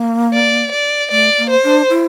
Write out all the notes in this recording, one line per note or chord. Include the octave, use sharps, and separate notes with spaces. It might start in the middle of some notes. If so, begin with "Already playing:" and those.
Already playing: A#3
D5
D5
A3 D5
A#3
C5
D4
E4